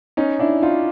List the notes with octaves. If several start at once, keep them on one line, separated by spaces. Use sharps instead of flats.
C#4 D#4
D4 E4
D#4 F4